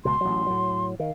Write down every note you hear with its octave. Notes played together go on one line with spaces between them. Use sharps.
C#2 B2 C6
A1 F#3
A2 F#3
D#3 F5